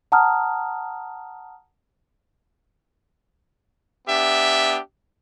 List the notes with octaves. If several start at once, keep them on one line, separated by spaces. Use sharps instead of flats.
F#5 A5 A#5 D#6 F6
B3 D4 G4 E5